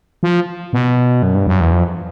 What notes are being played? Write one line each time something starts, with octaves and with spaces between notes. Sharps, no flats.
F3
B2
F#2
G2
F#2
E2
F2